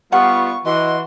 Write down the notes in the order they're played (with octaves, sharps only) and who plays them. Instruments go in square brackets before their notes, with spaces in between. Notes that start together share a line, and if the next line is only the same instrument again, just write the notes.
[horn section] G3 B3 F4 [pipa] F#5 [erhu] C#6
[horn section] E3 F#4 [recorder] D#5 [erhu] C6